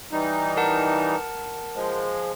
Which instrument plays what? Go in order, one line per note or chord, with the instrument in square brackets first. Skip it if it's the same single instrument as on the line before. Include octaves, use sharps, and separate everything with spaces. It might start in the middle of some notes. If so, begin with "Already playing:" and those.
[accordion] E3 G3 D#4
[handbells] A#4 F#5 A5
[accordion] F3 G#3